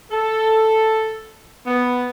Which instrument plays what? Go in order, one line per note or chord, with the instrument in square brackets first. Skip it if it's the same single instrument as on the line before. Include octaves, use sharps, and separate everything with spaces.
[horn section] A4
B3